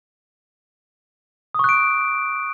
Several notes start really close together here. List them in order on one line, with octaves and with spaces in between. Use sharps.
D#6 C#6 F#6 D7